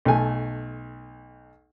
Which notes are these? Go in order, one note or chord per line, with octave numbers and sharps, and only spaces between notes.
B1 A3 G#5